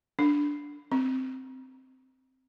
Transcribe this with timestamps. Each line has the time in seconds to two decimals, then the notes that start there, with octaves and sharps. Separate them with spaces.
0.19 D4
0.92 C4